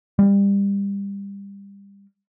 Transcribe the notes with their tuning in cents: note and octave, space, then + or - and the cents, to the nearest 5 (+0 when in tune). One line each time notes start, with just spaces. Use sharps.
G3 +25